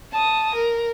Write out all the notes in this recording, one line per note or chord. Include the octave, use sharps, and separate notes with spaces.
A5 D#6
A#4